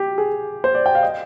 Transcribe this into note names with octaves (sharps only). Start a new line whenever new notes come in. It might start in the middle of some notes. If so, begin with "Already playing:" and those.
Already playing: G4
G#4
C5
D5
G5
F5
D#5